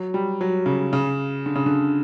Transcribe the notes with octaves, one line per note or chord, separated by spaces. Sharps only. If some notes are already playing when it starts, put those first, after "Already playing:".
Already playing: F#3
G3
F#3
C#3
C#3
D3
C#3
D3